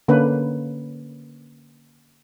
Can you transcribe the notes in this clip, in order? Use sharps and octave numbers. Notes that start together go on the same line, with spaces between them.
D3 A#3 C#4 B4